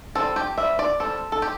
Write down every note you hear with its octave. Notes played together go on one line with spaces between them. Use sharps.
G3 C4 A4
G4
G3 C4 E5
D5
G3 C4 A4
A4
G4